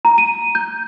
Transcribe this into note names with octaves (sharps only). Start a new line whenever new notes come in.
A#5
D#7
G6